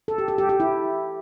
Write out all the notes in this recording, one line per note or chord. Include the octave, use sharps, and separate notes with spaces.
A4
G4
A4
G4
G4
E4